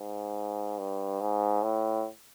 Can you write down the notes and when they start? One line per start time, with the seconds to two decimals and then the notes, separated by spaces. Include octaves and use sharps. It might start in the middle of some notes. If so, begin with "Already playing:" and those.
Already playing: G#2
0.78 G2
1.21 G#2
1.63 A2